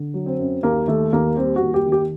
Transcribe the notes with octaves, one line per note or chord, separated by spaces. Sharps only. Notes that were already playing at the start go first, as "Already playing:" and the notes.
Already playing: D3
F#3
C4
F#2
D#2 A#3
D#3 A3
D#2 A#3
G3 C4
F#4
D#2
G4
D#3
G4